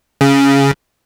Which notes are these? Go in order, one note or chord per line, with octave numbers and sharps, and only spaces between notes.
C#3